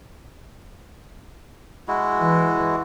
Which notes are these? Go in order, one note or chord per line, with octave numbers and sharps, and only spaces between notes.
G#3 E4 F#4
E3